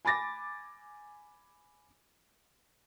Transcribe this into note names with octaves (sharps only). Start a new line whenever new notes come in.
G#5 B5 D6 A6 A#6